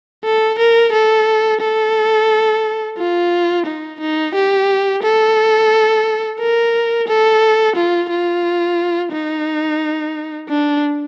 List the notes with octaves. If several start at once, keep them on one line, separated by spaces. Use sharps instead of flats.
A4
A#4
A4
A4
F4
D#4
D#4
G4
A4
A#4
A4
F4
F4
D#4
D4